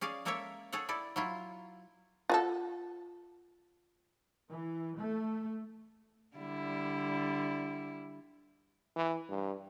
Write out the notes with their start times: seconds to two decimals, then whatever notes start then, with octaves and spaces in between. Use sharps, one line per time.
0.01 C#4 G#4 D5 F5
0.25 G#3 A#3 A4 A#4 C#5 E5
0.72 G#4 A4 C#5 F#5
0.89 E4 A4 D5
1.16 F#3 E4 F4
2.30 F4 F#4 A4
4.50 E3
4.99 A3
6.36 D3 G3 E4
8.96 E3
9.29 G2